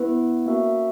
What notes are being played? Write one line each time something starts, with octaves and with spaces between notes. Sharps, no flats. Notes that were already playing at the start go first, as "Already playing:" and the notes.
Already playing: B3 E4 B4
A#3 C#4 F#4 A#4 E5